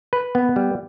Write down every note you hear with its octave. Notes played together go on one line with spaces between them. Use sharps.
B4
B3
G3